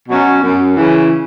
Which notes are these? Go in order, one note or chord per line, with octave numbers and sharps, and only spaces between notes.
B2 F#3 C#4
F#2
C#3 E3